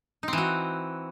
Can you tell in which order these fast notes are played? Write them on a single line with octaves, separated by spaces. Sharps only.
D#4 C4 E3 F#4